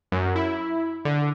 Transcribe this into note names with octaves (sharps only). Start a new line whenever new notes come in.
F#2
E4
D3